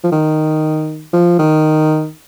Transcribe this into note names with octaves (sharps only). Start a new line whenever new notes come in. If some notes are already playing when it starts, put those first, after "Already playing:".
F3
D#3
F3
D#3